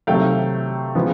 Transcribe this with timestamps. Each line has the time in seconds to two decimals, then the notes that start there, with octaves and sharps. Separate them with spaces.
0.07 C3 D#3 F#3 A3 F5 G5
0.95 C#3 F3 G#3 B3